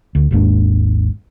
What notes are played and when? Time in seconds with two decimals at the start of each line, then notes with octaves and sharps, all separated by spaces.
0.15 D2
0.31 G#1 D#2 G#2 D4